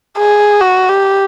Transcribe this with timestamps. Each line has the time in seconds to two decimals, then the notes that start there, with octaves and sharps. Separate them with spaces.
0.18 G#4
0.61 F#4
0.89 G4